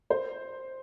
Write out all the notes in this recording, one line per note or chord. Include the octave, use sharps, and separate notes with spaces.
C5